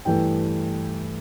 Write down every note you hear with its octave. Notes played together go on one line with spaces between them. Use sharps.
G2 E3 A3 G5